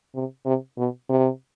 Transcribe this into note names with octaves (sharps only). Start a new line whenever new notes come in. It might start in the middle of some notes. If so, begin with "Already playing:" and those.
C3
C3
B2
C3